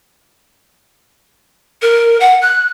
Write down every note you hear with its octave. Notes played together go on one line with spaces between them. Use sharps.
A#4
F#5
F#6